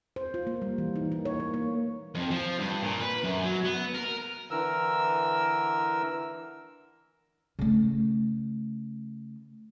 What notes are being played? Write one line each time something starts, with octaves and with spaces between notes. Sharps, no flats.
C5
F4
A#3
G3
E3
D#4
A#3
C#5
A#3
A#3
F2
F3
G2
A#2
B4
F#2
F#3
B3
A#4
D3 E3 A#4 E6
C#3 A3